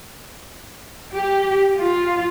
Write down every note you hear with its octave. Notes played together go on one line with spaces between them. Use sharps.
G4
F4